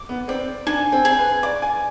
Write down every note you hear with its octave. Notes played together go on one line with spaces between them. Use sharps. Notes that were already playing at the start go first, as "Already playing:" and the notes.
Already playing: D6
B3
C4 D5
D4 G#5
C4
G#4
B4
D5 D6
G#5